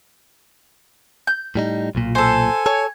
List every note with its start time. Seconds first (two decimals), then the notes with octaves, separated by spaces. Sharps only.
1.27 G6
1.55 A2 G3 D#4
1.95 B1 A#2 F4
2.15 A4 C5 G#5
2.66 A4 C#5